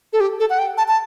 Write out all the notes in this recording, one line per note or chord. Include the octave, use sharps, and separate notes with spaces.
A4
G4
A4
F#5
G5
A5
A5